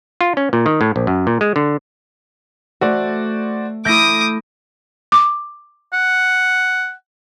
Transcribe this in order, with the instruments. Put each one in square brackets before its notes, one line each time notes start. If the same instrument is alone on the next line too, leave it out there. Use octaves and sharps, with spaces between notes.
[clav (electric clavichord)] F4
C#4
A#2
D#3
A2
A#1
F#2
A#2
G#3
D3
[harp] A3 [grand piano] F#4 C5 D5
[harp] A3 E4 [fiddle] D6 D#6 [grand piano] G6 A#6
[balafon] D6
[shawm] F#5